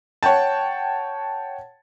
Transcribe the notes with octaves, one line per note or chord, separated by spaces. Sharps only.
C#5 F#5 G5 A5